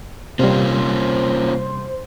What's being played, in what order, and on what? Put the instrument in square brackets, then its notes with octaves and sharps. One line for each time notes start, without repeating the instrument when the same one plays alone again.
[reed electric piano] C3 G3 [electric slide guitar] A#3 C#4 F4 [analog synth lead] C5